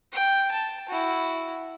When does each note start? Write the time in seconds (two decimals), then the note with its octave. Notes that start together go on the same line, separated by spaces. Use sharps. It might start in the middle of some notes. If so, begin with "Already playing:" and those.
0.12 G5
0.51 A5
0.89 E4 F#4